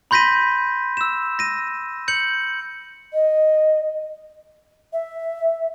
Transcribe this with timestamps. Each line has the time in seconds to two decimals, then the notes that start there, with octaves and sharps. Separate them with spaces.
0.11 B5 C6 G6 A#6 B6 D#7
0.97 E6 E7
1.39 A#6 D#7
2.08 G6 C#7 F#7
3.13 D#5
4.93 E5